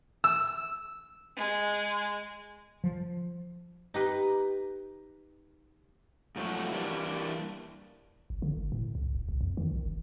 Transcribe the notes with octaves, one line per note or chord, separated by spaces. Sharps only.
E6
G#3
F3
D#4 G4 B4
G#2 F3 F#3 A3 F#4
E3 G3 A#3 D4
G#1
D3
G1
A2
C#2
E1
C2
F2
D#3
A#1
F1